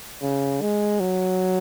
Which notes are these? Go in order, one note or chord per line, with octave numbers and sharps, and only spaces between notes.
C#3
G#3
F#3